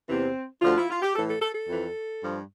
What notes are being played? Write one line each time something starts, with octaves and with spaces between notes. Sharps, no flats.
E2 C3 E3 C4
D2 D3 F3 F4
E4
F4
G4
A2 E3 A4
A4
A4
A4
F2 E3
G2 F3